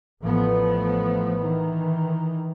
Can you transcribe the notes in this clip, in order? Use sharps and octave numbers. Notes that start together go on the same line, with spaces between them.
A1 F3 A3 B3
D#3 E3